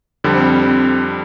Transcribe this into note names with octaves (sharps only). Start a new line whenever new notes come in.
F2 D3 G3 C4